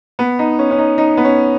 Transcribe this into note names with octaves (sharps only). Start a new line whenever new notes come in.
B3
D#4
C#4
C#4
D#4
D#4
B3
C#4